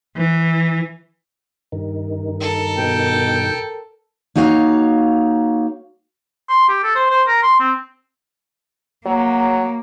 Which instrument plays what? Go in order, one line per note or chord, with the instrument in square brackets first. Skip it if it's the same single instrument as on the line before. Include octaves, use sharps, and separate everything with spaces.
[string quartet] E3
[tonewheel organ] G2 D#3
[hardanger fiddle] A4 A#4
[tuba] B2 [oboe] G5
[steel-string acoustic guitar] A#3 D#4 F#4 C#5 F5
[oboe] C6
G4
A4
C5
C5
A#4
C6
C4
[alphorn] F#3 [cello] A#3